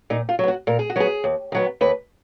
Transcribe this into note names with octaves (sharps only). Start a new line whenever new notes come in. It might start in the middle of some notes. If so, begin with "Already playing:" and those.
A#2 D#4
F4
F#3 B3
F#4
A#2 A#4
G#4
F#4
F#3 B3 G#4
D#2
D#3 F#3 B3
D#2 B4